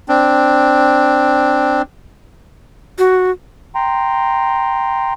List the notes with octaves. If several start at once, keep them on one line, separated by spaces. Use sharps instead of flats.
C4 D4
F#4
G5 A#5 C6